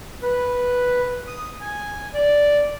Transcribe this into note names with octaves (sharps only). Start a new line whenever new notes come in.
B4
D#6
G#5
D5